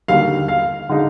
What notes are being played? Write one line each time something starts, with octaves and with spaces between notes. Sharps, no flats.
D#2 D3 G3 F5
F5
D3 G#3 D#4